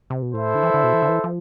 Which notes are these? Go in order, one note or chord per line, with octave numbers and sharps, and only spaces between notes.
C3
B2
A2 E4 A4 C5 E5
D3
E3
D3
B2
E3
D3
E3
F3